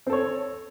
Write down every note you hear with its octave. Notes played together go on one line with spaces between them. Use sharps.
C4 A4 C#5